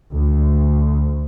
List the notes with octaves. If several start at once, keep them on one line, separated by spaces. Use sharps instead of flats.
D2